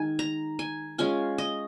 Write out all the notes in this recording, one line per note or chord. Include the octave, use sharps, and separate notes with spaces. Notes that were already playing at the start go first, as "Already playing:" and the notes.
Already playing: D#3 G#3 D#4 G#5
A#5
G#5
G#3 C#4 F4 G#5
D#5